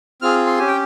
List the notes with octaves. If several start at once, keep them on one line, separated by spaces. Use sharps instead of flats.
C4 F4 G#4 F6
C6
C#4 G4 G#5
G5